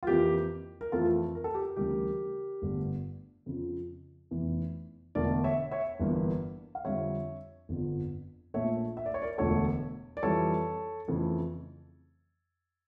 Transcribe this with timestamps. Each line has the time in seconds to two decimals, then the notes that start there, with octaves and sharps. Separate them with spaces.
0.03 F4
0.07 F2 E3 A#3 G4
0.81 A#4
0.92 F2 E3 A3 F4 A4
1.35 A#4
1.44 A4
1.54 G4 A#4
1.76 D2 C#3 E3 G3 G4 A#4
2.62 G1 G2 D3 A3
3.46 F2 C#3 F3
4.31 F1 E2 E3
5.15 E1 E2 D3 A3 A#4 D5
5.44 C#5 E5
5.71 C#5 E5
6.00 G1 G2 E3 A#3
6.75 F5
6.85 F2 D3 G3 C#5 E5
7.69 G1 F2 D3 F3
8.54 A#1 A#2 A3 C#5 E5
8.97 E5
9.06 D5
9.14 C#5
9.22 A#4 D5
9.38 E1 D2 D3 A3 A4 C#5
10.17 D5
10.23 F2 E3 G3 A4 C#5
11.08 F2 C#3 E3 A3